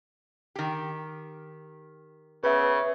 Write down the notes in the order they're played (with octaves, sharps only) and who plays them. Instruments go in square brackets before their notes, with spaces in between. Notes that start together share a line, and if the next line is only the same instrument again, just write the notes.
[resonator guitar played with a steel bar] D#3 G4
[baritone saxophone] C#3 [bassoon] B3 [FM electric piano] B4 E5